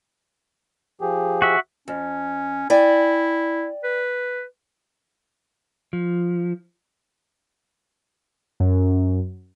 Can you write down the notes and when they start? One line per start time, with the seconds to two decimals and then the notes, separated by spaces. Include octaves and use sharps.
1.01 F3 G4 G#4
1.42 F#4 E5
1.88 F2 C#4
2.70 E4 D5 G5 G#5
3.84 B4
5.93 F3
8.60 F#2